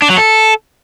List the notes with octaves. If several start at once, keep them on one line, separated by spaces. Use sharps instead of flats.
D4
F#3
A4